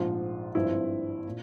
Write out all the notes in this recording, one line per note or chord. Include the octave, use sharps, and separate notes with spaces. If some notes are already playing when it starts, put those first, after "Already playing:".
Already playing: A#1 G#2 F3 F4
G#1 G2 F3 C4 E4
A#2